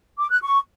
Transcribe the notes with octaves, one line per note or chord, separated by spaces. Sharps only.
D6
F#6
C#6